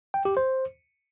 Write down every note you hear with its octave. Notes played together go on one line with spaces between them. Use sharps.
G5
G4
C5